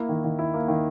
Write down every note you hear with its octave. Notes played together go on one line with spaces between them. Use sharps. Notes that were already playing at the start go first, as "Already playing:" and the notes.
Already playing: A#3 E4
D#3
D#3
E4
A#3
D#3